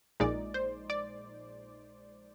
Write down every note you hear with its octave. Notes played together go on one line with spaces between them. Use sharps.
A#1 A#2 G#3 D#4 D5
C5
D5